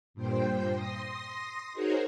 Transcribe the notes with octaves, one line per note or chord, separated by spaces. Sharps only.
G2 A#2 C5 G5
C6 D#6 A#6
D#4 F#4 G#4 A#4 C5 C#5